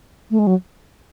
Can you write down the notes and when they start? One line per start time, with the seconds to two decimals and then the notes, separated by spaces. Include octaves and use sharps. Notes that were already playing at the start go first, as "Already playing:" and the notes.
0.31 A3
0.39 G#3
0.47 F#3